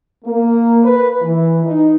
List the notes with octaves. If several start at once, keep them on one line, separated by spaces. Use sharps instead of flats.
A#3
B4
E3
D#4